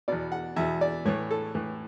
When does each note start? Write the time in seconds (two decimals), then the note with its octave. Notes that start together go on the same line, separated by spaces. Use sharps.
0.08 E2 B2 D5
0.32 F#5
0.56 E2 B2 E5
0.81 D5
1.05 A2 E3 C#5
1.31 A4
1.55 A2 E3